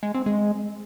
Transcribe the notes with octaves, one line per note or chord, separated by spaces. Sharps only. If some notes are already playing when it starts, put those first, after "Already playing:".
G#3
C4
G#3